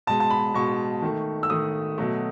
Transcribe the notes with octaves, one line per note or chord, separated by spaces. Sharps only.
B2 G#3 A5
A5
B5
B2 G#3 C#6
D#3 A3
E6
D#3 A3 D#6
B2 F#3 A3